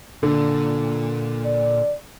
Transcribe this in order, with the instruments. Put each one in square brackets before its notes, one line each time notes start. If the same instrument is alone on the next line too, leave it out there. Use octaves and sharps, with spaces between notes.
[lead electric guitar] A#2 [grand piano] D3
[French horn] D5